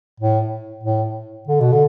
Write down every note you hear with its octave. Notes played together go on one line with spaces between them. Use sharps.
A2
A2
D3
B2
D3